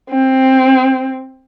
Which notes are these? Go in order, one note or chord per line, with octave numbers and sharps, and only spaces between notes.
C4